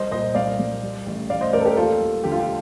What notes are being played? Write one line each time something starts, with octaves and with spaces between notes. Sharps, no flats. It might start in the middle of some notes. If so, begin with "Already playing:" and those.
Already playing: C2 C5 D#5
A#2 C5 D#5
C2 D5 F5
C2
G3
A1
A1 D5 F5
C5 D#5
A1 A#4 D5
A4
G4 A#4
D#2 F4 A4
G3
D3 G4
F4
G4